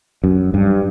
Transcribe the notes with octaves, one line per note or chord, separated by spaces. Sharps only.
F#2
G2